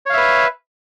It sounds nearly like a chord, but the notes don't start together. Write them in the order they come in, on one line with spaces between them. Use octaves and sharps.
C#5 F5 E5 B4